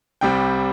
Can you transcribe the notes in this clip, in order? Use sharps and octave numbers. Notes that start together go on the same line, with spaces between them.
C2 C3 G3 G5